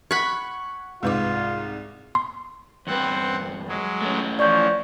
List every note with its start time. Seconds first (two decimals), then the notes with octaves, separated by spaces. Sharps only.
0.11 F#5 B5 C#6 F#6 G#6
1.03 C2 G#2 G#3 F4 B4 D6
2.15 C6
2.87 E2 G2 C4 B4 F#5
3.68 F#3 G#3
4.02 A3 C#4
4.39 E3 F3 D5 C#6 G6